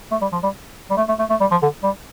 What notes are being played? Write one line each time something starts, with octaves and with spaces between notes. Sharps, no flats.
A3
G3
F3
G3
G3
A3
A3
A3
A3
G3
F3
D3
G3